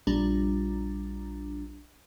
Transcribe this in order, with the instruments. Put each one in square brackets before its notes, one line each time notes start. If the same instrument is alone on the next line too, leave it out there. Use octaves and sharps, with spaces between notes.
[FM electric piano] A#1 G3 D4 A#5